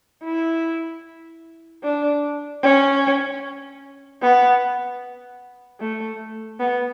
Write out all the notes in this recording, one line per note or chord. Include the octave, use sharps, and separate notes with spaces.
E4
D4
C#4
B3
A3
B3